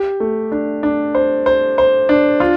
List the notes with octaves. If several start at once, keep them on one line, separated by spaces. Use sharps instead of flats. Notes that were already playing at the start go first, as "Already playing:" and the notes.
Already playing: G4
A3
D4
D4
C5
C5
C5
D4
F4